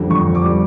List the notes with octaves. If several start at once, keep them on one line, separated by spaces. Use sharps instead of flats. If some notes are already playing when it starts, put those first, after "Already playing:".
Already playing: F2 D3 G3
F2 C#6
F2
D6
G3